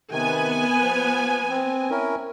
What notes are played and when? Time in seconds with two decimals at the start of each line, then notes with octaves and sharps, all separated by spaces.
0.11 C3 D#3 B3 G#5
0.81 F3
1.49 C4
1.90 C#4 E4 A#4